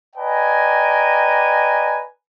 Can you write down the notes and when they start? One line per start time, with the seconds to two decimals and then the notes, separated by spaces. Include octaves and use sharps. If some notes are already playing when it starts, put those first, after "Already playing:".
0.16 B4 D5 D#5 G5 G#5 A#5